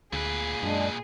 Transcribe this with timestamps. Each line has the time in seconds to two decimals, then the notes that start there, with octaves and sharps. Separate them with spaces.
0.13 D2 A#2 G#4 B4
0.63 F#2 G#3 D4